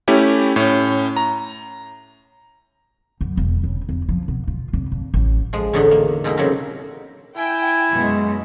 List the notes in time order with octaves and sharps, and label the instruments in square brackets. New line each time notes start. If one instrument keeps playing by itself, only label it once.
[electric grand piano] A3 C#4 E4 G4
A2 C#4
A#5
[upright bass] F#2
E1
C#3
F2
F3
B2
F4
F1
A#1
A1
[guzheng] F3 G#3
E2 A2 D3 B3 D#4 B5
A#3
B2 G#3 A#3 D#4 E4
C#3 F#3 C4 G4 A#4
[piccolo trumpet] E4 [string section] G5 [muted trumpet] G#5
[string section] F#2 B2 [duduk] G#3